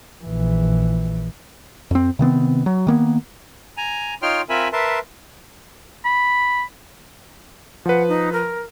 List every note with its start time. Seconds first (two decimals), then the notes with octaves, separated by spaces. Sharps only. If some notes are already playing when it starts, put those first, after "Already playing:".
0.24 A#1 E3
1.91 F2 C4
2.19 C3 D#3 B3 C4
2.66 F#3
2.87 D#3 A#3 B3
3.77 G#5 A#5
4.22 D#4 F4 C#5 G5 C6 F6
4.49 C4 F4 A#4 E5 G#5 B5
4.73 A#4 B4 E5 A5 C6
6.05 B5
7.86 F3 B4 F#5
8.08 D#4
8.32 A#4